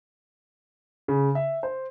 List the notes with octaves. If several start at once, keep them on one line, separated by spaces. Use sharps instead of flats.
C#3
E5
C5